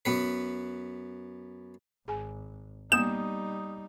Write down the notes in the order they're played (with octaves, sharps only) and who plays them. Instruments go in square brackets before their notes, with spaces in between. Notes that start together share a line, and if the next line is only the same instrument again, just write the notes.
[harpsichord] F#2 B3 B4
[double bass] G#1 [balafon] G#4 G#5
[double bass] G3 D#4 [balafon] A#3 B3 [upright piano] D#6 G6 [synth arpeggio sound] E7